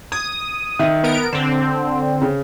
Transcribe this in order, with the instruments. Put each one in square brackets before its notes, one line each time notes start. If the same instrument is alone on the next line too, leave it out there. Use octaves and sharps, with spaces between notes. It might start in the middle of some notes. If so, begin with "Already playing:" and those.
[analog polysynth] D#6 [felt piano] G#6
[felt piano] D#3 E5
[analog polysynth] B3 A#4 D7
[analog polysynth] D3 C4 [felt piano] E7
[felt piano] C#3